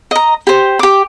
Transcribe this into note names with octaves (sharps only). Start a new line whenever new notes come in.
D#5 A#5
G4 C5
G4 D6